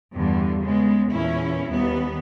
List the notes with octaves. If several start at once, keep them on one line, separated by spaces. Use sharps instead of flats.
E2 G2 D3 G3
C#3 G#3 B3
E2 A#2 C#4 E4
D#2 G3 B3